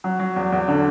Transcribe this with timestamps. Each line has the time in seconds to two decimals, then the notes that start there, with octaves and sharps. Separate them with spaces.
0.04 F#3
0.20 F#3
0.36 E2
0.52 E2
0.68 D3